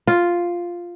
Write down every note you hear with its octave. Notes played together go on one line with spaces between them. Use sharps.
F4